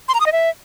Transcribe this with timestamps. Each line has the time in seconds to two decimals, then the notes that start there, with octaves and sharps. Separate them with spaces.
0.08 C6
0.14 A#5
0.20 D#6
0.26 D#5
0.32 E5